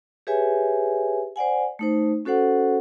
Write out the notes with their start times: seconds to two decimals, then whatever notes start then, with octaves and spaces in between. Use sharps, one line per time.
0.27 G4 G#4 B4 C#5 E5 G#5
1.36 C5 D5 F#5 G#5
1.79 A3 D#4 C5
2.25 C#4 F#4 A4 C5 F#5